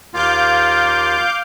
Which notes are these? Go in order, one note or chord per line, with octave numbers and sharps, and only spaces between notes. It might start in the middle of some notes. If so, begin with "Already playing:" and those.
D#2 A#3 F4 F5 D6 G6